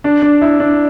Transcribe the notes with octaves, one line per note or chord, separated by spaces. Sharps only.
D4
D4
E4
D4